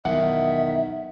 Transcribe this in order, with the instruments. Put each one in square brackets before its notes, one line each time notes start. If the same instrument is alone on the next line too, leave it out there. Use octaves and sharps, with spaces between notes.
[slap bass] B1 E2 B2 [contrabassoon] D#3 [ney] E5 [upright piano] F#5